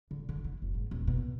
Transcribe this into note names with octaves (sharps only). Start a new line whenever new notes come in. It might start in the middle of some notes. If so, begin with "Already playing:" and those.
D3
D3
E4
F#1
G#2
D#1
B2